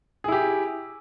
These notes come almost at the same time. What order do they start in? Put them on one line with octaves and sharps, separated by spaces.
G#4 E4 G4